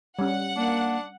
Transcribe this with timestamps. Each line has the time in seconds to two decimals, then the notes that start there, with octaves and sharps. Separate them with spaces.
0.19 G3 C#4 F#5
0.56 A#3 D4